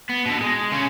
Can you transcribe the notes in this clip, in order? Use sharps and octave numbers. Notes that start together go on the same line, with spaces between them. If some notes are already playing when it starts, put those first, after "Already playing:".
B3
B2 D3
G#3
C#3 C#4